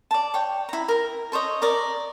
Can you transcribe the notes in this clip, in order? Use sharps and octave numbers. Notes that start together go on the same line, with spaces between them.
D5 A5
C#5 G5
E4 A#5
A#4 A#5
A4 C5 C#5 D#5
A#4 C#5 D5 D#6